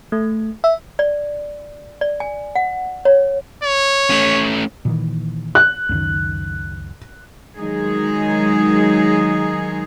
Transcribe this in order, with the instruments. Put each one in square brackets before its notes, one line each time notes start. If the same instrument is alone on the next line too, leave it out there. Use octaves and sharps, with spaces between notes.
[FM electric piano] A3
E5
[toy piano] D5
D5
G#5
F#5
C#5
[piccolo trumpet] C#5
[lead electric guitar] A3 C#4
[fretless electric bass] A#2 D#3 E3
[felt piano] F#6
[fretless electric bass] C#2 F#2 D#3
[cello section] D#3 F#3 G#3 D#4 G#4